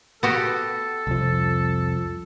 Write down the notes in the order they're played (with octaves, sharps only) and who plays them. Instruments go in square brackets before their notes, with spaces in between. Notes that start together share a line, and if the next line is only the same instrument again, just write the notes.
[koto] B3 F#4 G4 [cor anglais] A4
[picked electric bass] C2 F2 F3